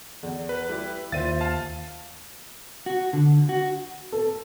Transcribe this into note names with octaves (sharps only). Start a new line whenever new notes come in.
E2
B4
G3 E4 G4
D#2 F4 C5 E5 A6 D#7
F5 A5
F#4
D3
F#4
A4